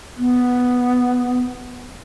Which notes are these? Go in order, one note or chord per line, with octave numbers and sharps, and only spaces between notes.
B3